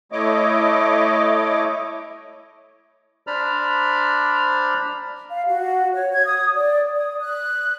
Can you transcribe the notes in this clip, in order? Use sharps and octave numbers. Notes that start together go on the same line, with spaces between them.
A3 E4 C#5 D#5 D6
D4 C5 D5 A#5 B5 F6
F5
F#4
C#5
G#6
D#6
D5
D#6
F#6